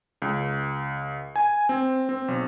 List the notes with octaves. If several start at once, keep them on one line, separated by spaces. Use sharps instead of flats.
C#2
G#5
C4
C4
B1